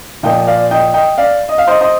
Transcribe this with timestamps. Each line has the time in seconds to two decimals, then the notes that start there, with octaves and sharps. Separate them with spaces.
0.23 A#2 F3 A#3 D#5 G5
0.47 D5 F5
0.71 D#5 G5
0.94 D#5 G5
1.18 D5 F5
1.49 D#5
1.58 F5
1.67 C5 D#5
1.81 C5 D#5